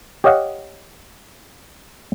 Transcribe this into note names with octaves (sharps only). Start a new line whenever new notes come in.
G4 C#5 D#5 F5 F#5